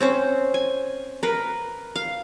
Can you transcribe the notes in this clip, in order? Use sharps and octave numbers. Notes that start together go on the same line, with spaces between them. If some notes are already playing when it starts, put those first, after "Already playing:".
C4 C#4 C5
G#5
A#4 B4
F5